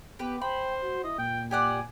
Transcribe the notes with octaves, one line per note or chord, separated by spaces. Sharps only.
B3 G4 B4
C5 G5 B5
F#4
E4 D#5
A#2 G5
G4 D5 F#5 G#5